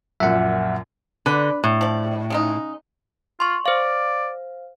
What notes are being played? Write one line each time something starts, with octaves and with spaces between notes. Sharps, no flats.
A#1 F#2 A#2 E5 F#5
D3 B4
A2
F3 D5
C#3 G#3 D#4
F4 C6 C#6
C5 D5 F5